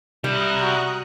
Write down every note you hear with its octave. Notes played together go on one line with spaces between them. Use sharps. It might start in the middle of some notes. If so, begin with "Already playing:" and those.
C3 G3 E4 A#5 D#6 F#6
F#4